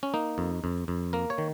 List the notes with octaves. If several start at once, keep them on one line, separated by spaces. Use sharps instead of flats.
C#4
A#3 D#4
F2
F2
F2
A#3 A#4
C#5
D#3